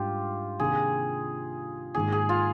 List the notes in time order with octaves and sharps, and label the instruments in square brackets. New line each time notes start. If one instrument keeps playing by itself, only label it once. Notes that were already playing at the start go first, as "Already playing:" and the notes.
Already playing: [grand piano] G#2 G3 D4 [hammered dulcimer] F4 G4
[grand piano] C3 D#3 A#3 D4 [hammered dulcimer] G#4
[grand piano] G#2 D#3 A#3 [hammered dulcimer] G#4
[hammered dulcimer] G#4
F4